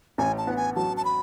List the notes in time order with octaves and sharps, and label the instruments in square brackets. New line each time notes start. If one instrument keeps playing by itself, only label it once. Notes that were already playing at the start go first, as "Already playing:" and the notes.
[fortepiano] A1 [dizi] G#5
[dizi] A5
[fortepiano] B3 [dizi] F#5
[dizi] G#5
[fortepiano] F#3 [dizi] A5
[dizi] A5
B5